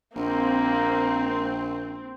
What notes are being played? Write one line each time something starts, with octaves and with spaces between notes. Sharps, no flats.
A#1 A#3 C4